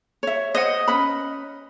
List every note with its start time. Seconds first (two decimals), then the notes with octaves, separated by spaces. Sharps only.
0.23 C#5 E5
0.55 C5 D#5 F#5
0.88 C#4 B4 B5